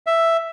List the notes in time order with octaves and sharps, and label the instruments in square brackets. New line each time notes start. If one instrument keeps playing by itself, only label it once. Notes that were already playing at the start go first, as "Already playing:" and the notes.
[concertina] E5